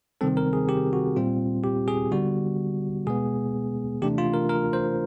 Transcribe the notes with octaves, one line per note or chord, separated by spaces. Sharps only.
C3 D#3 G3 C4 A4
A#4
G#4
G4
F#4
A#2 G3 C4 F4
G4
G#4
D3 G3 B3 F#4
B2 G#3 B3 G#4
C3 E3 A3 D4 G4
F4
A#4
A#4
C5